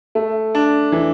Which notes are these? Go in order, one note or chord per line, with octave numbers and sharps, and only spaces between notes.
A3
D4
E3